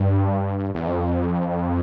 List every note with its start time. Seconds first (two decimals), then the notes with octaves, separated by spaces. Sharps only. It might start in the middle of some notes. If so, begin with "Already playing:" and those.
Already playing: G2
0.75 E2
0.87 F2